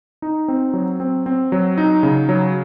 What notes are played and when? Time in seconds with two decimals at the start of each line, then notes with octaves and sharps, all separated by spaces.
0.22 D#4
0.48 C4
0.73 F#3
1.00 C4
1.26 C4
1.52 F#3
1.78 D#4
2.03 C#3
2.29 F#3